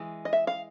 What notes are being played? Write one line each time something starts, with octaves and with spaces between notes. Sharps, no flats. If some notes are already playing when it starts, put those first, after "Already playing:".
Already playing: E3 G#3
D#5
E5
F5